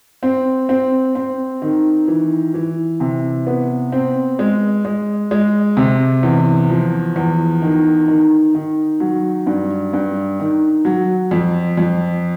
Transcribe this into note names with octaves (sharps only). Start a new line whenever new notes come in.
C4
C4
C4
D#3
E3
E3
C3
B3
C4
G#3
G#3
G#3
C3
E2
F3
E2
D#3
D#3
D#3
F#3
G2
G2
D#3
F#3
F2
F2